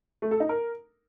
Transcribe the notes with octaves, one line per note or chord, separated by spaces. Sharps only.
A3
A4
D#4
A#4